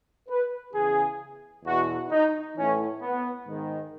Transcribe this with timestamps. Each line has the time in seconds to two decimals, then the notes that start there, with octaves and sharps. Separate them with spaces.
0.29 B4
0.74 E2 C#3 E3 G#4
1.65 E2 B2 F#4
2.10 D#4
2.56 A2 E3 C#4
3.01 B3
3.47 G#2 D#3